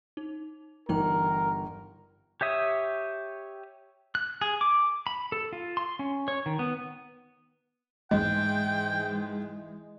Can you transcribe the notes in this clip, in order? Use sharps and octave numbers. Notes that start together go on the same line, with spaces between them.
D#4
G1 E3 D#4 A#4 G5
G4 C#5 E5 D#6
F#6
G#4
D6
B5
A4
F4
C6
C#4
C#5
D#3
B3
G#2 E3 G#3 D#5 G5